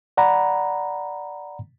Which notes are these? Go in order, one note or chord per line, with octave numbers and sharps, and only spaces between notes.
D5 F#5 A#5 B5